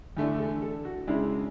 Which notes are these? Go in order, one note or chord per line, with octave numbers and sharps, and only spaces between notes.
E2 D3 A3 D4
A4
A4
F#4
C#3 G#3 D4 E4